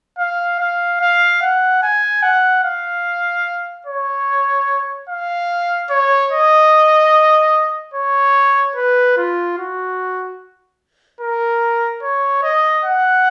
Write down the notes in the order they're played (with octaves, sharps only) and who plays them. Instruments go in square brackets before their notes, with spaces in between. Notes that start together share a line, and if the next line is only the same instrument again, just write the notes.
[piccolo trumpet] F5
F5
F5
F#5
G#5
F#5
F5
C#5
F5
C#5
D#5
C#5
B4
F4
F#4
A#4
C#5
D#5
F#5